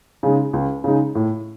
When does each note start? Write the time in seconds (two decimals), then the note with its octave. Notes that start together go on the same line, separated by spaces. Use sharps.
0.23 C#3 G#3 D#4
0.53 C#2
0.84 C#3 G#3 D#4
1.15 A2